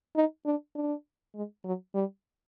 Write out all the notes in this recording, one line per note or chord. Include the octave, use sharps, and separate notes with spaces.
D#4
D4
D4
G#3
F#3
G3